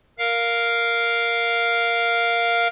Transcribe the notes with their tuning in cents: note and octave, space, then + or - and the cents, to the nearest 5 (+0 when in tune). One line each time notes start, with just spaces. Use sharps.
A#4 +0 F5 +0